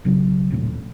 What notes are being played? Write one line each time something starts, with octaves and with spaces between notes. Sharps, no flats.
B1 C#3 F#3
D#1 A#1 A2